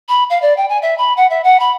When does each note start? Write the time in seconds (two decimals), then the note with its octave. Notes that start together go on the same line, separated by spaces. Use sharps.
0.08 B5
0.30 F5
0.42 D5
0.57 G5
0.69 G#5
0.82 E5
0.98 B5
1.17 F#5
1.30 E5
1.44 F#5
1.60 B5